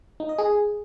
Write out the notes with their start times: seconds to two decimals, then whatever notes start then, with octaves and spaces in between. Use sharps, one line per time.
0.20 D#4
0.29 D#5
0.38 G#4